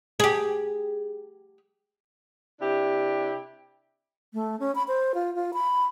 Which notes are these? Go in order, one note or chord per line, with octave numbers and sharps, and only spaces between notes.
G4 G#4
C3 D4 E4 G4
A3
C#4
B5
C5
F4
F4
B5